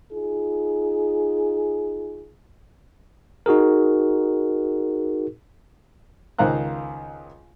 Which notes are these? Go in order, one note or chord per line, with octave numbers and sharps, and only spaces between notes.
D#4 F4 G#4
D#4 F#4 G#4 A#4
C#2 D#3 C5 F5 A#5 F#6